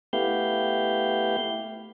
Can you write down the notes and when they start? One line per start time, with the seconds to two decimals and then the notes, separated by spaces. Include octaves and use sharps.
0.13 A3 B3 E4 G4 F5 G6